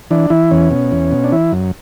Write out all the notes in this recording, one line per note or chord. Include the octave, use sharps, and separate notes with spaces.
E3 D4
E3 E4
E2 C#4
B2
E2
B2
D4
E3 E4
F#2